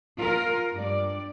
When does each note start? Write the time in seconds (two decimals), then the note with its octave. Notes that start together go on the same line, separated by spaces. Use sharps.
0.17 F4 A#4
0.74 G2 D5